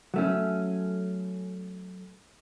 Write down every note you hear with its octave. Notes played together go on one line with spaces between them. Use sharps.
F#3 A3 C#4